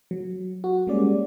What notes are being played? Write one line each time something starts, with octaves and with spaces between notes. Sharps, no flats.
F#3
F#4
G3 G#3 A#3 C#4 D5